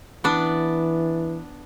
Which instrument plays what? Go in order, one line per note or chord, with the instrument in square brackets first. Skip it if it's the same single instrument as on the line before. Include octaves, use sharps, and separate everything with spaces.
[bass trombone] E3 [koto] B3 D4